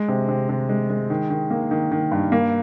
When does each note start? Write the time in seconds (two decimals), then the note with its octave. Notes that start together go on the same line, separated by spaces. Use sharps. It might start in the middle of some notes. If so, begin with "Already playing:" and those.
Already playing: G#3
0.08 C3
0.29 C3
0.49 C3
0.69 G#3
0.90 G#3
1.10 D#3
1.30 D#3
1.51 A#3
1.71 D#3
1.91 D#3
2.12 G2
2.32 A#3